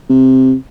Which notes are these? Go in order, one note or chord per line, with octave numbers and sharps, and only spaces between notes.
C3